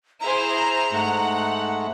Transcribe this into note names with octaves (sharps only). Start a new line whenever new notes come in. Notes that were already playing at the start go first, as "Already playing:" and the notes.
E4 G#4 C5 A#5
G#2 A3 F#5